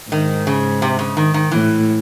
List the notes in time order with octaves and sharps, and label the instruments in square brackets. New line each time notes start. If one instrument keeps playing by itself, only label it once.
[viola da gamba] G#2 [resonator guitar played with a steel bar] D#3
[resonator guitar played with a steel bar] C#3
C3
C#3
D#3
D#3
[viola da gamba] A2 [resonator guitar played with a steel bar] E3